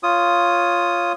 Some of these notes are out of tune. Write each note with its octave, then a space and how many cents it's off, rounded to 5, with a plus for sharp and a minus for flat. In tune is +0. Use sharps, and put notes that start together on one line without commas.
F4 +0 C#5 +0 D#6 +0